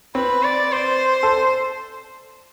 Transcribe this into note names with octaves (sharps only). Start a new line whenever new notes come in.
C4 B4
D5
C5
A4